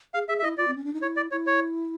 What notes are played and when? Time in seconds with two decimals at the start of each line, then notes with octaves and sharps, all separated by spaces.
0.14 G#4 F5
0.28 G#4 E5
0.39 E5
0.43 E4 D#5
0.58 F4 D5
0.68 C4
0.76 C#4
0.84 D4
0.93 D#4
1.02 E4 C#5
1.17 D5
1.31 E4 C#5
1.47 C#5